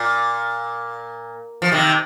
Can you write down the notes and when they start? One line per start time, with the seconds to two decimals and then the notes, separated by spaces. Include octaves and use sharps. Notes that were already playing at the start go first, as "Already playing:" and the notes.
Already playing: A#2
1.62 F3
1.72 C3 D#3